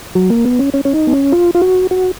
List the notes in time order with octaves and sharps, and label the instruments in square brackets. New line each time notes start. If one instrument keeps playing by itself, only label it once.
[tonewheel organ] F#3
A#3
B3
C#4
C#4
C#4
D#4
B3
C#4
F4
F4
F#4
F#4